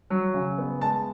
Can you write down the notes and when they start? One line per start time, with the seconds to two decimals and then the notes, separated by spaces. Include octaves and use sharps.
0.10 F#3
0.34 C#3
0.58 B3
0.81 G#3 A5